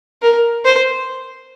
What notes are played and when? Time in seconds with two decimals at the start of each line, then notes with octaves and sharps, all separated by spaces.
0.22 A#4
0.65 C5